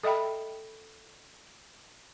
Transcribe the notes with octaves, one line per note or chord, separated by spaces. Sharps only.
A4 D#5 E5 G5 B5